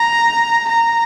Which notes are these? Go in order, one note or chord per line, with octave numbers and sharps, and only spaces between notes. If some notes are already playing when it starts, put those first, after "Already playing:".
Already playing: A#5
A#5